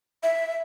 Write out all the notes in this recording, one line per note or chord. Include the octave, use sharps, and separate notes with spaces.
E5